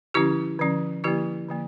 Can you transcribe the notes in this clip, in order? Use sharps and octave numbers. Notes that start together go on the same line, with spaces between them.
D3 F3 C#4 E4 G4
D3 F3 C#4
D3 F3 A#3 E4 G4
D3 F3 A#3